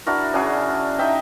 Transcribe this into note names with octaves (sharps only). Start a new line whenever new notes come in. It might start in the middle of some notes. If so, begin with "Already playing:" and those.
D4 E4 F#4 A#4
C#3 D4 F#4 G#4
D#4 E5 G5